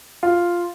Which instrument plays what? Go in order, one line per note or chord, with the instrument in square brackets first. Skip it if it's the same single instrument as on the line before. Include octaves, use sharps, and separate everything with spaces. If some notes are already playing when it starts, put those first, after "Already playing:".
[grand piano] F4